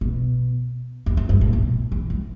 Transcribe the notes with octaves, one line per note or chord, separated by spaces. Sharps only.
B2
E2
F2
G2
A2
B2
E3
G3